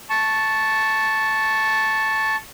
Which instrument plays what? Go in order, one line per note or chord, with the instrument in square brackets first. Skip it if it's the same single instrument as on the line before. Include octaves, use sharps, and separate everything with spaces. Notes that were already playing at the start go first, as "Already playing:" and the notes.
[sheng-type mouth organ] A5 C#6